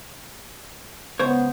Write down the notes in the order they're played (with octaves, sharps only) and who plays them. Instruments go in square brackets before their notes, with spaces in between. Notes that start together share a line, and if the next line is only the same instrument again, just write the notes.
[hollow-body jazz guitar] C#2 C5 C#5 [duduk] B3